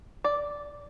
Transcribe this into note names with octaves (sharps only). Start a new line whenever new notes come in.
D5